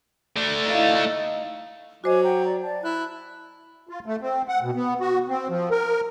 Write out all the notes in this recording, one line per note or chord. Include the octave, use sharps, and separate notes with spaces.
A3 D4
D#4 E4 F5
D#5
F#3 F#4 C5 D#5 G#5 D6
F#5 G5 A#5
D5 A#5
D5 A5
E4 F#6
F4
A3
C4
F#5
B2
B3
F#4
C4
F3
A#4